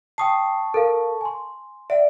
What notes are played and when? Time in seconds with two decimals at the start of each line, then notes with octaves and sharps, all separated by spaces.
0.18 G5 A5 C#6 D#6 C7
0.74 A4 A#4 F5
1.21 G#5 C6
1.90 D5 E5 F#5